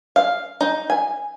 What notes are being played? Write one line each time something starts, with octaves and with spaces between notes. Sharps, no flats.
F5
D#4
G#5